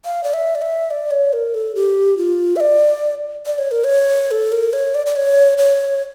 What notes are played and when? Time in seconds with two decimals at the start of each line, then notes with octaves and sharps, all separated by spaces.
0.05 F5
0.24 D5
0.34 E5
0.55 D5
0.62 E5
0.91 D5
1.11 C#5
1.33 A#4
1.54 A4
1.75 G4
2.17 F4
2.56 E5
2.60 D5
3.46 D5
3.58 C#5
3.71 A#4
3.84 C#5
4.31 A4
4.52 A#4
4.73 C#5
4.95 D5
5.06 D5
5.16 C#5
5.58 C#5